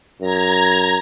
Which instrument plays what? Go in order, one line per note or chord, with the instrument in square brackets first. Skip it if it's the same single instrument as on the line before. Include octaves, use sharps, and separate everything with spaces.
[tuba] F#2 [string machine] A#5 G#6